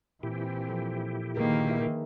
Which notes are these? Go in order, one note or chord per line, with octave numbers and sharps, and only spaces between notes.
A#2 E3 C4 E4 G4
F3 A4
D3 D#3 A#3 G#4 A#4 B4
D#4 E5